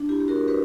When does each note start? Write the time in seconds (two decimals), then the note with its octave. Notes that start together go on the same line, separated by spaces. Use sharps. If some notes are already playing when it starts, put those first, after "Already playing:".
Already playing: D4
0.09 E4 G4
0.20 G4
0.28 F#4 A#4
0.48 G4 B4